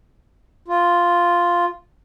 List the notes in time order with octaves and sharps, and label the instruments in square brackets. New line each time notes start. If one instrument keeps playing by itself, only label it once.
[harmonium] F4